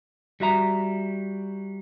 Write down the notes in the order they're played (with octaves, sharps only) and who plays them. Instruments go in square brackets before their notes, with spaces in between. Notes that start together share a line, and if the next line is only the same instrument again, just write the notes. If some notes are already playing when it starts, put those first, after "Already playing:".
[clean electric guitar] G3 F#4 E5 A#5